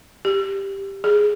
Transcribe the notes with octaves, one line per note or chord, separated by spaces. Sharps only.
G4
G#4